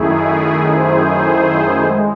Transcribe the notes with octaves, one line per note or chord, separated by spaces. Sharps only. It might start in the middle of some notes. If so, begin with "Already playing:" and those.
Already playing: F#2 D#3 A3 E4 G#4
G#4 C5
G#3